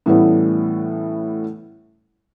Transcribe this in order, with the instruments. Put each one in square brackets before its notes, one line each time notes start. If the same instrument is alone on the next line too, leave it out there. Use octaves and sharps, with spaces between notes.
[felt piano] A2 E3 G3 A3 B3 C#4